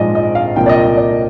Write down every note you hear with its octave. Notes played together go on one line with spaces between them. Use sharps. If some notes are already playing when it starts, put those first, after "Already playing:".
Already playing: A#1 G#2 F3 G#3 D5 D#5
D#5
F5
C2 A#2 F3 A#3 G5
D5
D#5
D#5
D5